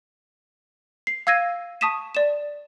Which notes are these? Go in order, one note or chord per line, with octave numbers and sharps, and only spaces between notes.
C7
F5 E6 G#6 A#6 D#7
A5 C#6 D#6 B6 D#7 E7
D5 E7